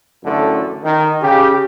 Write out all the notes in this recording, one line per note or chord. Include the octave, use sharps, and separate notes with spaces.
A1 F#2 A2 D3 A3
D#3
C#3 G4